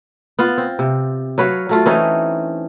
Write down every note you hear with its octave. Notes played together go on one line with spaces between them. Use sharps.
B3 F4
C4
C3
F#3 B4 C#5 F5
F#3 A3 F4
E3 C4 C#4 D#4